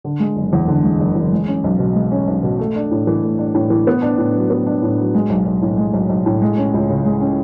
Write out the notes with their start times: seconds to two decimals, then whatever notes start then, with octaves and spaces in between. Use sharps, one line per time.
0.04 D3
0.20 G#3
0.36 F#1
0.53 E2
0.68 D3
0.83 G#3
1.00 F#1
1.15 E2
1.32 G#3
1.48 C#4
1.64 B1
1.79 B2
1.95 G#3
2.11 C#4
2.28 B1
2.43 B2
2.59 A3
2.76 D4
2.91 A2
3.07 E3
3.23 A3
3.39 D4
3.55 A2
3.70 E3
3.87 B3
4.02 D4
4.18 A2
4.35 F#3
4.50 B3
4.67 D4
4.83 A2
4.98 F#3
5.14 G#3
5.30 B1
5.46 B1
5.62 A2
5.78 G#3
5.94 B1
6.09 B1
6.26 A2
6.42 G#3
6.58 C#4
6.74 C#2
6.89 C#3
7.05 G#3
7.21 C#4